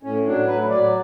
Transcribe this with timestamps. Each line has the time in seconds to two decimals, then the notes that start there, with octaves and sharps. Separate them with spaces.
0.03 A2 C#4
0.26 F#3 D4
0.47 A2 B4
0.69 F#3 D5